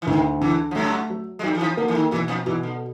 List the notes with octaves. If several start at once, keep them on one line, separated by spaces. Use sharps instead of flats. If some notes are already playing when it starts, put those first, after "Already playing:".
E3
D2 D#3
E2 D3 E3
F3
F#2 F#3 A3
F#3
G#3
G2 F#3 G3
E3
F2 F3
D3 A#3
E3
D#3
E2 B2 E3
F2 F3
E2 B2 E3
D3